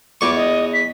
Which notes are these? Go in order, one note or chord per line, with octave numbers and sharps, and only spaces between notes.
E2 C#6 D6
D#5
B6